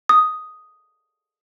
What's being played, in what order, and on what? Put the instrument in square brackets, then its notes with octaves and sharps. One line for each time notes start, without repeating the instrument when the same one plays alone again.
[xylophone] D#6